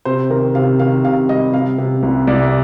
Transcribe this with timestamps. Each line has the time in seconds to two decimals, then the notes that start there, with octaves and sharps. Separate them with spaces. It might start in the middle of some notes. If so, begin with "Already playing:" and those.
0.05 C3 C5
0.30 D#3 A#4
0.55 C3 F5
0.79 D#3 F5
1.04 C3 F5
1.29 G3 D#5
1.53 C3 F5
1.78 C3
2.03 C2
2.27 C2 D5